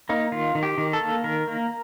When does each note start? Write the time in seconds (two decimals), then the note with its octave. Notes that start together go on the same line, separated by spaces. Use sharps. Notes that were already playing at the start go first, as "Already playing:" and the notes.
0.09 A#3 D#4
0.32 D#3 F4
0.55 D#3
0.63 G4
0.78 D#3
0.93 A4
1.01 A#3
1.24 D#3 A#4
1.47 A#3